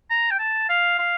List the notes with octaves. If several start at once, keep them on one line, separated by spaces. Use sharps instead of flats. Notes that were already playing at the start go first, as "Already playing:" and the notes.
A#5
G5
A5
F5
F5